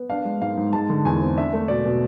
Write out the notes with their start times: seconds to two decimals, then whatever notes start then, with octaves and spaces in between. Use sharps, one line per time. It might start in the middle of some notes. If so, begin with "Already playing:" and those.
Already playing: B3
0.10 D4 F5
0.25 G#3
0.41 G#2 F5
0.57 G#2
0.73 G#3 A5
0.90 D3
1.05 E2 G#5
1.21 C4
1.37 D4 E5
1.53 A3
1.68 B2 D5
1.85 B2